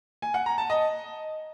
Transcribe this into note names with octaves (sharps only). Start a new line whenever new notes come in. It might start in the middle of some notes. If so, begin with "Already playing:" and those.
G#5
F#5
A#5
A5
D#5